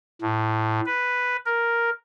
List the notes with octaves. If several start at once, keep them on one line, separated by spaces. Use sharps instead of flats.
A2
B4
A#4